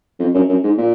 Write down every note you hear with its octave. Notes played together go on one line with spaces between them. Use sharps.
F2
F#2
F#2
G#2
A#2